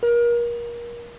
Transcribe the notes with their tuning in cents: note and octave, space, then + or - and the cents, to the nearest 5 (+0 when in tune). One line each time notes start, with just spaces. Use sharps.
A#4 +30